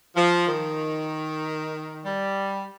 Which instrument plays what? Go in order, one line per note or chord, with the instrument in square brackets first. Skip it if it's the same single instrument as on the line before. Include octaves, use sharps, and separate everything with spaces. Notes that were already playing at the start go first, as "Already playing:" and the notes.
[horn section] F3
D#3
G3